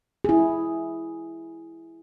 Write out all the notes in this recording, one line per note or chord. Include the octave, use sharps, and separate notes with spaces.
E4 G#4